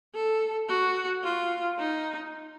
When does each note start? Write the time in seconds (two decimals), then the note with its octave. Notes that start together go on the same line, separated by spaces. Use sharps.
0.14 A4
0.69 F#4
1.23 F4
1.78 D#4